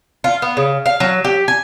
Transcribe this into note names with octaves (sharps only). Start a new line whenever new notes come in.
F4
B3
C#3
F5
F#3
G4
G#5